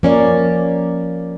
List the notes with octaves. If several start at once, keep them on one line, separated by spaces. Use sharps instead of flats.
F3 A#3 C#4 A#4 D5